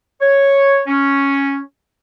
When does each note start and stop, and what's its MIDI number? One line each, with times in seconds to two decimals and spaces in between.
0.21 0.81 73
0.88 1.60 61